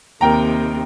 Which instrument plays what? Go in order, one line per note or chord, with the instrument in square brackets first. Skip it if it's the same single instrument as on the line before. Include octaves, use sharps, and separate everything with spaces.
[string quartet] D#2 C3 D#3 [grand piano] A#4 G5 A#5